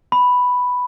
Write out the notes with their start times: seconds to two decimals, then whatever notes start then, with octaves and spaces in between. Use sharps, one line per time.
0.12 B5